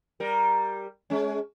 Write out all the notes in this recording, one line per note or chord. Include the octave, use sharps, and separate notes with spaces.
G3 A#4
G#3 C#4